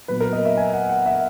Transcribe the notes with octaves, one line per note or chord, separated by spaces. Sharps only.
A#2 F#3 B3 B4
A#4
D#5
E5
G#5
F#5
F#5
E5